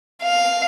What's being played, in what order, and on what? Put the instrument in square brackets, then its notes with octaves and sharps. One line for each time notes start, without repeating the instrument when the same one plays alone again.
[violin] F5